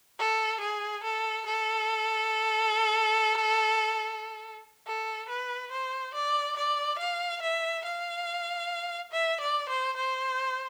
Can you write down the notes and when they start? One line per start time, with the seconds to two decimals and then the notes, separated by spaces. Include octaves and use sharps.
0.19 A4
0.61 G#4
1.04 A4
1.46 A4
4.87 A4
5.29 B4
5.72 C5
6.14 D5
6.56 D5
6.99 F5
7.42 E5
7.85 F5
9.12 E5
9.41 D5
9.69 C5
9.97 C5